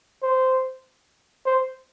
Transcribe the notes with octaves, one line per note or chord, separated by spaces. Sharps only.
C5
C5